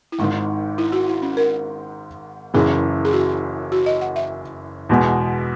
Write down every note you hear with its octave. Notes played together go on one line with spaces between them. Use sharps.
E4
G#1 G#2 D#3 D#4
E4
F#4
E4
C#4
A#4
F#1 F#2 E3 G#4
G#4
F#4
F#4
D#5
F#5
E5
E2 B2 G#3